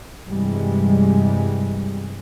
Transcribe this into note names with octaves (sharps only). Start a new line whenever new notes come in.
G2 C3 E3 G3 G#3